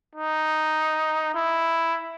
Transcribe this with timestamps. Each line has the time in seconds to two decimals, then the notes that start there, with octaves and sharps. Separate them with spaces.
0.15 D#4
1.35 E4